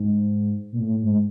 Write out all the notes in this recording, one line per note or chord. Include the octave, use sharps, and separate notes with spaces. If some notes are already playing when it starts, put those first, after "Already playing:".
Already playing: G#2
A#2
A2
G#2